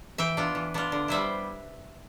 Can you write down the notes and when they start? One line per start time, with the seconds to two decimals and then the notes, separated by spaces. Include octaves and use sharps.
0.18 E3 E5 G5
0.37 B3 D4 F4
0.55 E3
0.74 B3 D4 F4
0.92 D3
1.08 G3 B3 E4 C5 E5